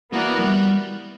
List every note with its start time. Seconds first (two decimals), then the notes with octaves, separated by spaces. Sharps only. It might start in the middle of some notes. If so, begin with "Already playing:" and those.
0.12 E3 A#3 B3 F#4 A#4 D5
0.39 F#3
0.44 G3